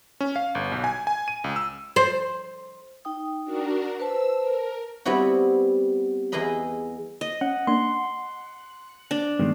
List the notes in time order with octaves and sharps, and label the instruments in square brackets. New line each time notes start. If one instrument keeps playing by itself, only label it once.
[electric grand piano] C#4
F5
G1
B1
G#5
G#5
D#7
C#2
E6
[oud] C5
[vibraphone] D#4 G5 D#6
[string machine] D4 F#4 A#4
[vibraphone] B4 C5 A5 [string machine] E6
[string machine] A#4
[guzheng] G3 B3 C4 E4 F#4
E2 E4 G#4 B4 D#5 B5
[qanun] D#5
[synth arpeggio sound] C#4 [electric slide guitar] F#5
[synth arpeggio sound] A#3 D4 [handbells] C6
[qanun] D4
[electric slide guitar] G2 D#3 G#3 [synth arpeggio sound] B3